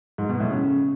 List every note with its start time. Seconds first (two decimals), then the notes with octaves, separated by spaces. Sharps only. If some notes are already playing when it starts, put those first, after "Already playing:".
0.18 G#2
0.29 B2
0.40 A2
0.51 C#3